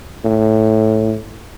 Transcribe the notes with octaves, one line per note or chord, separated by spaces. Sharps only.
A2